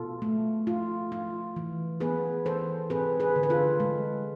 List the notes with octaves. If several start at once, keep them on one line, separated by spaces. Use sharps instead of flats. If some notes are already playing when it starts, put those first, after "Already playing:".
Already playing: B2 F4 A4
A3
F4
F4
E3
B3 G#4 B4
E3 A4 C5
C4 G#4 B4
G#4 B4
D3
B4
F4 A4
G#3